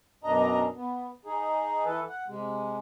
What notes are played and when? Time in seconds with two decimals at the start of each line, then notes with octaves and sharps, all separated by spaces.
0.24 F#2 B2 D4 D#5 A#5
0.76 B3
1.25 D#4 G#4
1.85 E3 A4 B4
2.09 F#5
2.28 C3 G#3